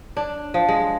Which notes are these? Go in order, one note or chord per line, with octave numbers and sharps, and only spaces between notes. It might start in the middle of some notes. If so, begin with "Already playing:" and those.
D4
F3
G#3